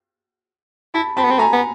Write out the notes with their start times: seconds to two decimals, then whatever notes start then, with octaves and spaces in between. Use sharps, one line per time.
0.94 E4 A5 B5
1.17 C4 A5 B5
1.24 B3
1.31 C4
1.39 A3 G#5 A#5
1.53 B3